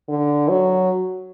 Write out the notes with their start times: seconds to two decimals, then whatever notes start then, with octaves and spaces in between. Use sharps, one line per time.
0.09 D3
0.49 F#3